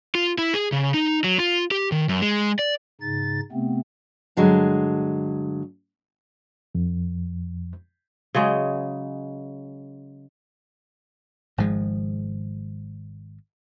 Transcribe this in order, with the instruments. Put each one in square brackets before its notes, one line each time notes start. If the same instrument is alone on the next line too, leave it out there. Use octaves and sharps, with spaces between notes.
[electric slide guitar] F4
E4
G#4
C#3
D#4
F#3
F4
G4
D#3
F#2
G#3
D5
[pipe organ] G#2 C#3 D#4 A6
C3 A3 B3 C4
[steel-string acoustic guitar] G2 D3 F#3 G#3
[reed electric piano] F2
[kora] C#3 F#3 G#3 D#5
[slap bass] G#1 G#2 F3 G#3